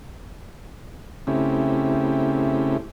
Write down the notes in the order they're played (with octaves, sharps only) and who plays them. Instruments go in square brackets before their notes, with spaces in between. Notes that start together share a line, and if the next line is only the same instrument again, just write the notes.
[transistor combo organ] C#3 A3 C4 C#4 E4 G4